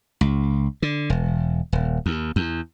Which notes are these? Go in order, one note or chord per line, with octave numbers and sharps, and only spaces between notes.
C#2
D3
E1
D#1
D#2
E2